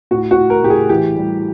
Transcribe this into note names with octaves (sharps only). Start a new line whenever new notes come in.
A2 F#4
F#4
A2
A#4
A2 G4
G#4
E3 G4
G3